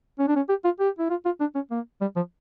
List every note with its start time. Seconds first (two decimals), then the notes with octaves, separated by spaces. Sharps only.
0.19 C#4
0.28 D4
0.36 C#4
0.49 G4
0.64 F4
0.80 G4
0.99 E4
1.10 F4
1.25 F4
1.40 D4
1.55 C#4
1.71 A#3
2.01 G3
2.16 F3